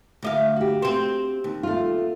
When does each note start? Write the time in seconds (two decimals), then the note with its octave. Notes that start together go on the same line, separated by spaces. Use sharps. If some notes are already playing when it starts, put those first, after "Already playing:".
0.23 D2 D#5 F5
0.56 F#4 G4
0.82 C4 C5
1.44 D#2
1.63 A3 F4